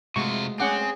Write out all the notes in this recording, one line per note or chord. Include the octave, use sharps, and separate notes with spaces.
C3 G#3 A3 F4 F#4 C#6
C4 C#4 G#4 F#5 D6